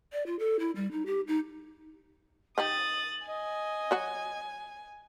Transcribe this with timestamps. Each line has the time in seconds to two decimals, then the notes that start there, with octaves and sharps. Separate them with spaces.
0.13 D5
0.26 F4
0.39 A4
0.59 E4
0.76 G3
0.92 D#4
1.06 G4
1.28 D#4
2.58 D#3 D#4 G4 D#6 A6 F#7
3.27 D#5 G#5
3.91 F#3 F#4 F#5